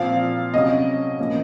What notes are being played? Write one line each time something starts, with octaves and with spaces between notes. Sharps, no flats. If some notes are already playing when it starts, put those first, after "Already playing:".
Already playing: A#2 F3 C4 F5
C3 F#3 C#4 D#5
F3 A#3 C#4